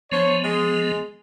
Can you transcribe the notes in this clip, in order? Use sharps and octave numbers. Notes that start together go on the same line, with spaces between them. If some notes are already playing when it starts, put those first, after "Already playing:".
F3 B3 D4 C5 C#5
G#3